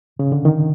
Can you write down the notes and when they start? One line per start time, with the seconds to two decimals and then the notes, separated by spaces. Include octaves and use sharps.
0.19 C#3
0.32 D3
0.45 D#3